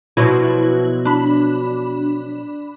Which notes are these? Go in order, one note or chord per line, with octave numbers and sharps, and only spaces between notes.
B2 F3 F#3 E4 F#4
D4 B5